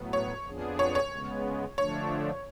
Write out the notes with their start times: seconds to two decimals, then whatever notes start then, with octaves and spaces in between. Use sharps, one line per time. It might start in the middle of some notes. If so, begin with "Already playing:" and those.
Already playing: A2 F#3 B3
0.13 C#5
0.46 F2 F3 B3 D4 G#4
0.79 C#5
0.95 C#5
1.11 C#3 G#3 B3
1.78 D3 F3 A3 D4 C#5